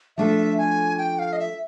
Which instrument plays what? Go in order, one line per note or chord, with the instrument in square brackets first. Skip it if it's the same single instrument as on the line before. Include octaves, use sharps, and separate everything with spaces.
[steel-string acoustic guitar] F3 A3 D4 F4 A4 [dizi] E5
[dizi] G#5
G5
F5
D#5
E5